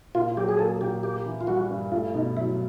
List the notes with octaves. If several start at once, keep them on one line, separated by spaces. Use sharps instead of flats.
A#2 F4
F#3 G4
G#4
A#3 A4
A#2 G4
A#3 G4
E3
F4
G3 F#4
G2
A3 F4
B2 D#4
F#3 E4